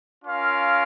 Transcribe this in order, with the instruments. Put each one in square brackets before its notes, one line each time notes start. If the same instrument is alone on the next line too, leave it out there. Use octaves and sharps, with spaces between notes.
[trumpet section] C#4 F4 A#4 F5